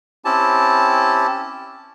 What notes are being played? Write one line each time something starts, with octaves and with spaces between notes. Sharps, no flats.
C4 C#4 E4 G4 A5